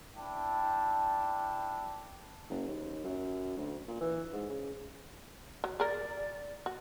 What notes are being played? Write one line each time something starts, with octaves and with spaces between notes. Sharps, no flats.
D4 E4 G5 A5
F#1
D#2
F#2
D2
A#2
E3
G#2
C#3
F#3
G#4 A#4 D5
F#4